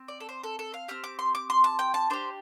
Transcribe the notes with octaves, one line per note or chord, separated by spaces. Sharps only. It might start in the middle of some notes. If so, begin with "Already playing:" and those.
Already playing: C4
D5
A4
C5
A4
A4
F5
C4 G4 F6
D6
C6
D6
C6
A5
G5
A5
D4 G4 C5